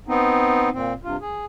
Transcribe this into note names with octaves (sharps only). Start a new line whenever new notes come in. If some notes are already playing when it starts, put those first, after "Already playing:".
B3 C4 D#4
A#2 C4
G2 C3 F4
G#4